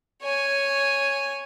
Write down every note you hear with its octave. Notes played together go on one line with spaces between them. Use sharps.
C#5 G#5